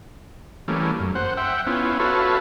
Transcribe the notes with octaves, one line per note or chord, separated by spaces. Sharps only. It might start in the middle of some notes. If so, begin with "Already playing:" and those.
E3 G3 A3 A#3 C#4
F#2
C5 F#5
E5 F#5 G5
B3 C#4 E4 F4
F#4 A4 B4 C#5 E5 F5